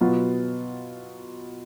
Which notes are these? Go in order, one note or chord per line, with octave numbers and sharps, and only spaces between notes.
B2 F#3 B3 F4